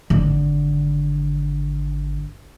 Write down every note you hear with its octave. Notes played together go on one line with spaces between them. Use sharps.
G#1 D3